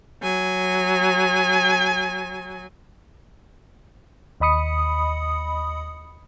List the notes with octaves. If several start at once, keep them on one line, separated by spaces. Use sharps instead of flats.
F#3 G#5
D#2 D#5 B5 D#6 C#7